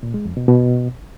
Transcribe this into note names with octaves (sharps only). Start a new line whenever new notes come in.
A#2
G#3
F2
B2
B2